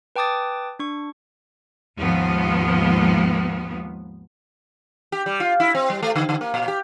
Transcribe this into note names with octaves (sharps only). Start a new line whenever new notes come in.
B4 G5 A5 D6 D#6 A6
D4 C#6
D#2 G#2 F3 B3
G4
G3
F4
E4
C4
G3
A3
D3
D3
A#3
A#2
G4